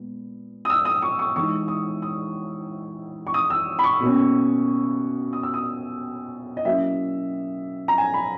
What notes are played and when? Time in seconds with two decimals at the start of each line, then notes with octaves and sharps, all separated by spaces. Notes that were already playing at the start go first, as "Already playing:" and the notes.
Already playing: A#2 G#3 B3
0.65 D#6
0.70 E6
0.85 D#6
1.02 C#6
1.19 C#6
1.36 E3 G#3 D#4 C#6
1.68 D#6
2.02 D#6
3.27 C#6
3.34 D#6
3.50 E6
3.79 B5
3.84 C#6
4.00 B2 A#3 C#4
5.33 D#6
5.43 E6
5.54 D#6
6.57 D#5
6.65 F#3 A#3 C#4 E4 E5
7.88 A#5
7.98 G#5
8.14 B5